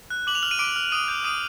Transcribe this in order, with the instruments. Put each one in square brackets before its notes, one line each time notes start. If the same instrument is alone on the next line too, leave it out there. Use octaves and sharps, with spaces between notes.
[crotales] F#6
D6 F#7
F7
F6 F#7
D#7
D6 D7
F6
D#6 D#7
G6
D#6 D#7